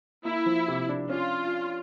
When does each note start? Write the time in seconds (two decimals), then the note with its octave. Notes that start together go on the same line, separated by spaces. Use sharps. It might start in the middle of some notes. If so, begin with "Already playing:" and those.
0.25 A#3 E4
0.46 F3
0.68 C3
0.89 D4
1.09 C#4 F4